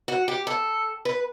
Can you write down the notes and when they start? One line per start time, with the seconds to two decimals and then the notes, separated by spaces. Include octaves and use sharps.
0.08 F#4
0.28 G4
0.47 A4
1.05 B4